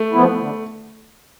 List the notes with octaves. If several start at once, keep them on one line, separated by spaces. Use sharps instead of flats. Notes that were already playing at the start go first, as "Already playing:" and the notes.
Already playing: A3
F3 B3 E4
D3